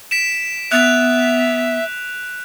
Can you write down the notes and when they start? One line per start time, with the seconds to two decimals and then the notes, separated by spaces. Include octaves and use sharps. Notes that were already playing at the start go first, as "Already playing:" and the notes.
0.11 B6 D7 E7
0.72 B3 E5 F#6 F7